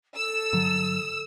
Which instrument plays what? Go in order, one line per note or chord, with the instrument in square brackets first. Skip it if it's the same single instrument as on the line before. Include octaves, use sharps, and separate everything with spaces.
[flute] A4 [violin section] E6
[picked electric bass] G2 D3 F#3